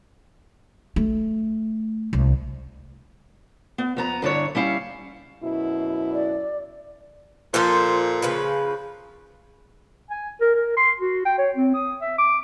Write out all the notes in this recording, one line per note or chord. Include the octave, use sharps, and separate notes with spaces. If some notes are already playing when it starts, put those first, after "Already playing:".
A3
C2
B3
F2 B3 A#5
G2 D3 E4 C#5
G3 C#4 E4 F5
F#2 B2 E4
D5
A#2 F3 A4 C5
C#3 F3 B4
G#5
A#4
A#4
C6
F#4
G5
C#5
C4
D#6
E5
D6